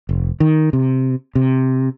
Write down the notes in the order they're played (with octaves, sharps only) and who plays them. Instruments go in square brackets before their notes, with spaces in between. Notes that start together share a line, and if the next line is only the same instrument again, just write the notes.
[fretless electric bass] F1
D#3
C3
C3